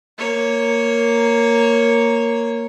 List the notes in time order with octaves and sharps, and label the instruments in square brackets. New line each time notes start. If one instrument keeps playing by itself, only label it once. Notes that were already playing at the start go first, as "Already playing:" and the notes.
[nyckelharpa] A#3 C#5